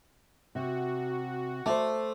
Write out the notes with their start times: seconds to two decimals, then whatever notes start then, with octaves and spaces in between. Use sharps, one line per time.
0.55 C3 F#4
1.66 A3 C5 D5 A5